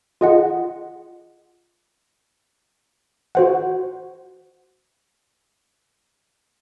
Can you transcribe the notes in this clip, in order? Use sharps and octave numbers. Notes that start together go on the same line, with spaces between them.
F4 G#4 D#5 F#5
F#4 C5 F#5